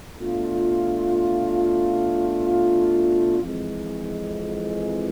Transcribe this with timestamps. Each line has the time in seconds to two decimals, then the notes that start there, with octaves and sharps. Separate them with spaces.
0.18 B2 A3 D4 F4
3.41 F2 E3 G#3